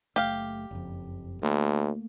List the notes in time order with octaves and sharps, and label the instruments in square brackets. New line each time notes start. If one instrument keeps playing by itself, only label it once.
[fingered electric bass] F#1 A3 [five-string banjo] G4 F5
[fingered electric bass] F#1 F2
[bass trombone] D2 [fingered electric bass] A3 A#3